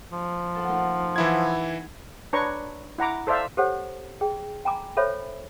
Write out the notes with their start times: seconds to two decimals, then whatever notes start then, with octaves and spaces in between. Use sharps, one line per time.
0.12 F3
0.55 B3 A4 F#5
0.68 A3 A#3 D#4
1.16 E3 E4 F#5 G#6
2.33 D4 B4 C#5 A#5 C#6
2.98 E4 F#5 A#5 D6
3.27 A4 C5 D5 E5 F5
3.57 G4 A4 C5 C#5 F#5
4.21 G#4 G5
4.65 G5 G#5 A#5 B5 D6
4.97 A4 C5 C#5 E5 B5